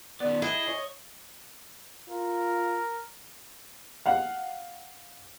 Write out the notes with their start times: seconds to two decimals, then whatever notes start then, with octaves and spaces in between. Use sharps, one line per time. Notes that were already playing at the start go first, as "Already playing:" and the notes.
0.20 D#3 B3 D5
0.42 E4 G#4 D#5
0.68 C#5
2.09 F4 A#4
4.06 F5 F#5